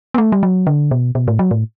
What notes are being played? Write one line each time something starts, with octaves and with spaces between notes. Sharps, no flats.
B3
A3
G3
F#3
D3
B2
B2
A2
F#3
A2